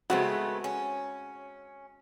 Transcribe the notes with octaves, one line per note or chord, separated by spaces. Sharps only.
C#3 G#3 A3 B3 C4 F#4
C#4